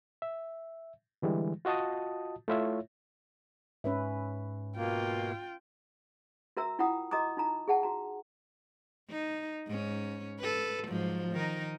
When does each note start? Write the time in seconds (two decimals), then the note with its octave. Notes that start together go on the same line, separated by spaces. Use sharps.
0.22 E5
1.22 D3 E3 G3 G#3
1.65 F4 F#4 D#5 A5 D#6
2.48 A3 E4 F4 C#5 E5
3.84 G#2 C#4 B4 E5
4.77 B2 A#3 F4 G5
6.57 F#4 A#4 E5 A#5 E6
6.79 E4 F4 F#5 G5 A#5 D#6
7.11 F#4 D#5 A#5 D6 D#6
7.37 D#4 F4 A#5
7.68 G#4 E5 F#5 A5
7.83 F#4 A#5
9.10 D#4
9.67 G#2 C#4
10.40 A4 B4
10.88 G#2 F3 F#3
11.32 D#3 D#4 A#4